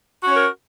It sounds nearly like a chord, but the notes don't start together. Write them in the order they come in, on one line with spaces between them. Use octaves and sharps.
F#4 C#4 C#5 A#4